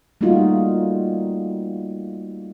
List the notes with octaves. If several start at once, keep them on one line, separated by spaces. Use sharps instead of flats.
G3 A3 A#3 D#4 F4 F#4